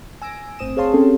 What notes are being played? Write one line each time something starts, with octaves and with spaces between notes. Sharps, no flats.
G#5 E6 A#6 D7
G1 A2 C4 D#6 E7
G#4 C5 C#5 F5 A5 C6
C4 C#4 G4 A4